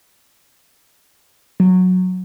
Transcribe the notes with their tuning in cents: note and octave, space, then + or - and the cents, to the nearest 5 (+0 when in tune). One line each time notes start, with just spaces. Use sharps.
F#3 -10